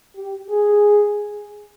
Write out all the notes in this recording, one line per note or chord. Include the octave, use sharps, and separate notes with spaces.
G4
G#4